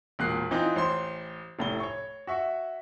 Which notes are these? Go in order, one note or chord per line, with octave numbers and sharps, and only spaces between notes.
E1 A#2 F#6 C7
E3 C4 D#4 F4
A1 C5 C6
F1 A2 G7
C#5 C#6
F#4 E5 C#6